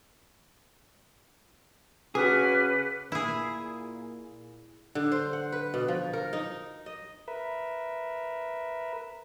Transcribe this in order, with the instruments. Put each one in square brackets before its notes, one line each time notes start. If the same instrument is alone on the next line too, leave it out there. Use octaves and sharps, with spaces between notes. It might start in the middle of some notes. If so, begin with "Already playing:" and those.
[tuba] C#3 [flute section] F#4 D6 F6 [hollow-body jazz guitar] G#4 [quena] B4
[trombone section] A#2 A#3 [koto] E4 G#4
[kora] D3
C5
F#5
B4
B2
F3
A#4
D#4
D#5
[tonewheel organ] A#4 B4 E5